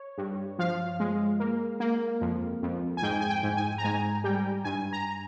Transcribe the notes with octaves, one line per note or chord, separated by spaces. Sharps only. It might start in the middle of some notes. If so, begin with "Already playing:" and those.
Already playing: C#5
G2
F3 F5
G#3
A#3
A#3
F2
F2
G#5
G#2 G5
G#5
G5
G#2
G#5
A#5
G#2 G#5
G3 G5
G2 G#5
A#5